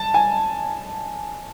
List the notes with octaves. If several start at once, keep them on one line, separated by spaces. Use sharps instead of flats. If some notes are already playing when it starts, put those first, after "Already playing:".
Already playing: A5
G#5